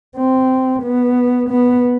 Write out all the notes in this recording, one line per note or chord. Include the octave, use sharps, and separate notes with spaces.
C4
B3
B3